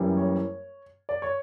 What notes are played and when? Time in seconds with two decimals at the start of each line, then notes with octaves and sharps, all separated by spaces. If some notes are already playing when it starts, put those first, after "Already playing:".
Already playing: F#1 F#2 E3 G3
0.17 C#5
1.09 D5
1.22 C#5